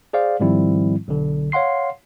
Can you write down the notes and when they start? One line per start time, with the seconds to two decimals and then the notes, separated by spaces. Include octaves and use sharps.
0.13 G#4 C5 D5 F5
0.40 G#2 D#3 F3 G3 C4 E4
1.08 B1 D3
1.52 C#5 F5 F#5 C6 C7